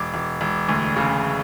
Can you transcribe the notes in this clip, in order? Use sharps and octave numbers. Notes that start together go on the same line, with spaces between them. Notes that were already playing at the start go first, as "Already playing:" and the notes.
Already playing: E1 D6
E1
E1
D2
C#3